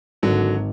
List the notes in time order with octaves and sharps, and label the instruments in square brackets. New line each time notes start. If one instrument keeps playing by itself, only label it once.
[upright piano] G#1 [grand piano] D3 F#3